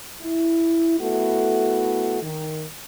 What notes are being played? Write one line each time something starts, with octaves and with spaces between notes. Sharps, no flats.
E4
A3 B3 E4 F#4 A4
D#3